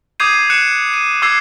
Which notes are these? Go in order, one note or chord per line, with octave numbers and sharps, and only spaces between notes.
D6 D#6 G6 G#6 C7 D#7
F#6 C#7 E7
D#7
D6 E6 G#6 C7